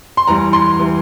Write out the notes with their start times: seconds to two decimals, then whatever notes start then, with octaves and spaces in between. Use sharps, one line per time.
0.17 C6
0.27 E2 E3 G3 A#5
0.53 C6
0.79 E3 G3